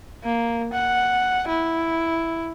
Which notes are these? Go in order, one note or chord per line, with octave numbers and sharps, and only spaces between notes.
A#3
F#5
E4